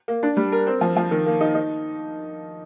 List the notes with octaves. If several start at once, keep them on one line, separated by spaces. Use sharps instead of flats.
A#3
D4
G3
A#4
C4
F3
F3
D#3
A#3
D#4
D#4